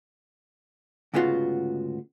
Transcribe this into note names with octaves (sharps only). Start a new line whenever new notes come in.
D2 G#2 C#3 B3 F4 F#4